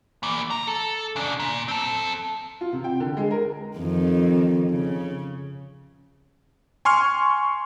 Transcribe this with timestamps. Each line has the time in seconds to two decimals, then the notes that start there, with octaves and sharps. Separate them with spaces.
0.23 E3 A#3
0.50 A#5
0.67 A4
1.16 C#3 D4
1.40 A#2
1.68 C4 A4
2.61 F4
2.73 C3
2.84 G5
3.00 D3
3.17 G#3
3.31 A#4
3.77 F2 D#3
4.70 C#3
6.85 G#5 C6 C#6 F6